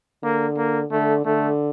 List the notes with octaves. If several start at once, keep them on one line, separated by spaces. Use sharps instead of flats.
D3 A#3
A#3
D3 A3
D3 A3